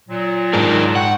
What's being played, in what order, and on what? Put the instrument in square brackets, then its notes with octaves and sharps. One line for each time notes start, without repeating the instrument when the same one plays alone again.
[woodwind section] A#2 F#3
[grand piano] G#2 [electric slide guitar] D4 D#4 A#4
[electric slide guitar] F#5 [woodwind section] G5 C#6